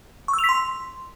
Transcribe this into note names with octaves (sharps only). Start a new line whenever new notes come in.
C#6
E6
F7
B6
C6